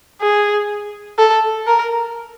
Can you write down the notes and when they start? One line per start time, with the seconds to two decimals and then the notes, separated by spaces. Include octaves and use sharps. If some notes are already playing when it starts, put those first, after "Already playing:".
0.22 G#4
1.19 A4
1.67 A#4